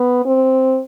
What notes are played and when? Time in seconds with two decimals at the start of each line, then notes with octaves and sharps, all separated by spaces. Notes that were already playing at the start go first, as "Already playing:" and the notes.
Already playing: B3
0.25 C4